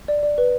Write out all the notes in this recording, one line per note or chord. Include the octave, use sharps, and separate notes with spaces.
D5
D5
B4